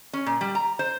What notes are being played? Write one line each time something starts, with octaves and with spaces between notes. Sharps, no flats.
C#4
A#2
G3
A#5
C5